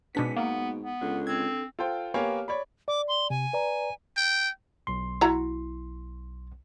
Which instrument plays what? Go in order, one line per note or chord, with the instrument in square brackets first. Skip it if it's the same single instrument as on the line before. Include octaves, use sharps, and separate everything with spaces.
[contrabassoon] G#2 [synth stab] B2 D4 B6 [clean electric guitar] B3 C#4
[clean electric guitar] B2 [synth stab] A#3 [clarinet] B3
[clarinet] B3
[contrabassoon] C#2 [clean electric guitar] D3
[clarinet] C4 [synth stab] G#6
[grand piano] F4 A4 C5 G5
A#3 B3 G4 C#5 F5 G#5
C#5 D5 B5
[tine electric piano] D5 [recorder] D6
[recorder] C6
[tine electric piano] C3 [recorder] G#5
[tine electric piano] B4 D5 A#5
[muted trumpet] G5
[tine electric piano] B1 C6
[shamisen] E4 F#4 A#5